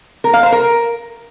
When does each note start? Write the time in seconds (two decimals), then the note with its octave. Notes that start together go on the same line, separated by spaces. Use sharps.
0.24 A#4
0.34 F5
0.43 C5
0.52 A#4